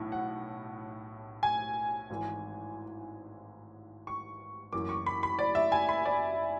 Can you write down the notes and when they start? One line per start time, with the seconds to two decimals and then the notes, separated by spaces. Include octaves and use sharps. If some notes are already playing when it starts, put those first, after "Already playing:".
Already playing: B1 A2 E3
0.12 F#5
1.43 G#5
2.10 G#1 G#2 E3
4.07 C#6
4.73 F#1 F#2 E3 D6
4.89 C#6
5.06 B5
5.23 B5
5.39 D5
5.55 E5
5.72 G#5
5.89 B5
6.05 D5